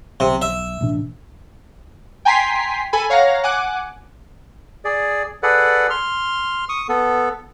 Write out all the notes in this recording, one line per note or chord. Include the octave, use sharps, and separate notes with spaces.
B1 C3
E5
A1 B2 D4
G5 G#5 A#5 C6 B6 C7
A4 G#5 B5
C#5 F5 F#5 A#5 A#6
F#5 G#5 D6 F#6
G#4 D5
G#4 A4 B4 D5 F#5
C6 F6
C#6 D#6
B3 A4